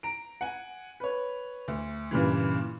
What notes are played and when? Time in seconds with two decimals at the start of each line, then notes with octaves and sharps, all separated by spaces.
0.03 A#5 D7
0.41 F#5 G#5
1.00 B4 C#5
1.68 D2
2.11 G2 A#2 C#3 E3